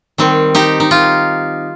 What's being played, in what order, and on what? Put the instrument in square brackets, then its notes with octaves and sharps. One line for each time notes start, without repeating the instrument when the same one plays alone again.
[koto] D#3 G3 C4
D#4 G4
D#4
F4